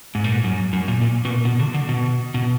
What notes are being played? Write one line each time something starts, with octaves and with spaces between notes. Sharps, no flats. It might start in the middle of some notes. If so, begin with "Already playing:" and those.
G#2
A#2
G#2
F#2
F#2
A#2
A#2
B2
A#2
B2
D3
D3
B2
B2